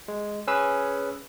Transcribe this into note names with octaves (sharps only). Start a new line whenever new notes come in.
G#3
C#4 G#4 B4 E6